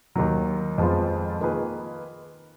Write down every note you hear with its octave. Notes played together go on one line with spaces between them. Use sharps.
D#2 D#3 F#3
F2 F3 G#3 B3 F4
D#3 A#3 F4 G#4 B4